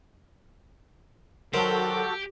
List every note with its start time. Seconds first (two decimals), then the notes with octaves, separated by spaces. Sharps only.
1.54 D#3 F#3 F#4 G4 A4 C5